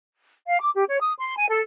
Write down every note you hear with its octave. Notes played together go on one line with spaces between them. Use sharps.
F5
D6
G4
C#5
D#6
C6
G#5
A4